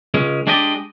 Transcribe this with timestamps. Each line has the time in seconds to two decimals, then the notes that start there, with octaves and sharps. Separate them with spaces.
0.14 C#2 G#3 C#4
0.47 G#3 D4 G4 D5 D#5